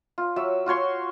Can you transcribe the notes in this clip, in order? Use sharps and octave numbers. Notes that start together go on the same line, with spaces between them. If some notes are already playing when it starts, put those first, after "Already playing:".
F4
F#3 E5
F4 F#4 C#5 C6